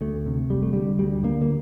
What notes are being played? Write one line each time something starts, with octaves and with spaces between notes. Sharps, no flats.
D2 A3
C3
F1 G3
A3
D3 G3
D2 G3
D3 A#3
A#3